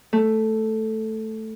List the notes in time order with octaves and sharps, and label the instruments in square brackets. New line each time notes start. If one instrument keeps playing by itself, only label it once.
[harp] A3